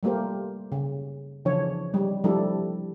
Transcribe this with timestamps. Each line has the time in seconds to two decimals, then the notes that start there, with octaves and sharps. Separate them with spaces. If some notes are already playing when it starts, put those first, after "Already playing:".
0.03 G3 A3 A#3 G4 C5
0.72 C#3
1.45 C#3 E3 F3 D4 C#5
1.94 G3 G#3
2.24 F3 G3 A3 D4 E4 A4